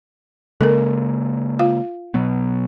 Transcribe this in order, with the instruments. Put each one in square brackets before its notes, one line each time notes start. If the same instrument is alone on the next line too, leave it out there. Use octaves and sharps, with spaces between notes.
[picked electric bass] C#3 G#3 A#3 [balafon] A4 A#4
[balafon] F4 F5
[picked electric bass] B2 F#3 B3